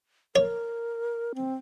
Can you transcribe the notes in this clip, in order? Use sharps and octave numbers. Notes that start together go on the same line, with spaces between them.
A#4 C#5
C4